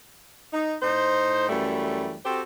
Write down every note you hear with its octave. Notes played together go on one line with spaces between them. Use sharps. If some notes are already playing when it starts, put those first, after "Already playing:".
D#4
A2 D#4 C5
F#2 E3 G3 A3
C4 F#4 G4 A4 C5